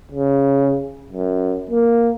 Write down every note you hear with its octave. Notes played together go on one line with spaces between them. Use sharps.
C#3
F#2
A#3